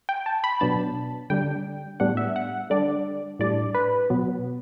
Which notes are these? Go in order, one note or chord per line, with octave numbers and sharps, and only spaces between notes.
G5
A5
B5
B2 F#3 B3 D4 A5
D3 G3 D4 G5
A2 G3 B3 D4 F#5
E5
F#5
D3 G3 D4 D5
A2 G3 D4 D5
B4
B2 F#3 B3